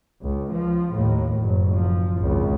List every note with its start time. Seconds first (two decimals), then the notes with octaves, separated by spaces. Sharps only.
0.22 C#2
0.52 F3
0.93 D#2 A2
1.40 F#1
1.74 F3
2.19 G#1 C#2